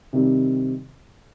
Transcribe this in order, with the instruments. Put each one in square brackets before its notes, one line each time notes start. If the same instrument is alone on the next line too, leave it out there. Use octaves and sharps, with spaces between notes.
[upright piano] C3 D#3 G3 C4